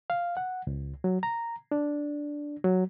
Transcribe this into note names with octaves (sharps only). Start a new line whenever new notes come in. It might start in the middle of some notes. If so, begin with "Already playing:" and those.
F5
F#5
C#2
F#3
A#5
D4
F#3